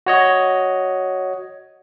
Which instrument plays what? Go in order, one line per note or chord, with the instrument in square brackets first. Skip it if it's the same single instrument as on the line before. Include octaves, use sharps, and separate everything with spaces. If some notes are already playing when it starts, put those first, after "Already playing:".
[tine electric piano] F#4 C#5 D#5